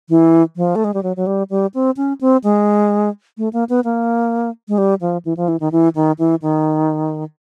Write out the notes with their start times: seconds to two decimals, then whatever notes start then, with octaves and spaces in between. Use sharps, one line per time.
0.10 E3
0.57 F3
0.76 A3
0.84 G#3
0.94 G3
1.03 F#3
1.16 F#3
1.27 G3
1.50 G3
1.74 C4
1.97 C#4
2.21 C4
2.44 G#3
3.38 A3
3.53 A#3
3.69 B3
3.84 A#3
4.68 G#3
4.78 G3
5.01 F3
5.25 E3
5.37 F3
5.48 E3
5.60 D#3
5.72 E3
5.95 D#3
6.19 E3
6.42 D#3